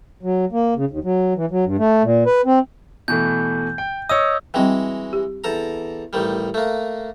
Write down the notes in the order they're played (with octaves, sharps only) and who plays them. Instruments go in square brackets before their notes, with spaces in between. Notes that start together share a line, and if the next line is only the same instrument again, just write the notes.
[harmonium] F#3
A#3
C#3
D#2
F#3
E3
F#3
G2
A3
A#2
B4
C4
[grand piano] B2 E3 A3 [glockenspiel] G6
[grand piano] G5
[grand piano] C#5 D#5 [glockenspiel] D#6 E6
[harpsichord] E3 G#3 F#4 [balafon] G3 C4 G5
[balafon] G4
[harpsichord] E2 A4 A#5
A1 D#3 G3
A3 A#3